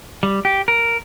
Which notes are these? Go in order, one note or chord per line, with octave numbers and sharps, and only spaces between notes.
G3
G4
A#4